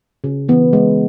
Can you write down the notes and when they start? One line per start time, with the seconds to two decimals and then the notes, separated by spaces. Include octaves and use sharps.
0.24 C#3
0.49 E3 B3
0.73 G#3